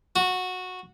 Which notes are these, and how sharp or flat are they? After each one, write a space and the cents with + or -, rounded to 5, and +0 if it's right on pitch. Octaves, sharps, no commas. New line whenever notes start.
F#4 -15